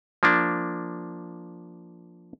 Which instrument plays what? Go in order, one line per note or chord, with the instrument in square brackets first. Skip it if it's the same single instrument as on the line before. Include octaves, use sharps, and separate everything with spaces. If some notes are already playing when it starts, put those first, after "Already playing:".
[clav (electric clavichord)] F3 A#3 D4